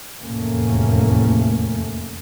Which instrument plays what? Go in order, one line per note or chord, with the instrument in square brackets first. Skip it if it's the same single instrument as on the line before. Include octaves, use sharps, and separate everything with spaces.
[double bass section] F1 E2 A2 A3 A#3 C#4